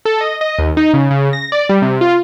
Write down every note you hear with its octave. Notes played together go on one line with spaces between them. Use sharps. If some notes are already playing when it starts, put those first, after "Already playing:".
A4
D#5
D#5
D#2
D#4
C#3
C#3
A#6
D5
G3
C3
F4